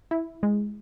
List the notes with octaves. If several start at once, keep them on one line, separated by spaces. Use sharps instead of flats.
E4
G#3